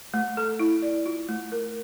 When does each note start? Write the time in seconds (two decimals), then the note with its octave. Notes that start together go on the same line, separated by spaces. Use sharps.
0.14 A3
0.37 A4
0.60 E4
0.82 D5
1.06 F4
1.29 A3
1.52 A#4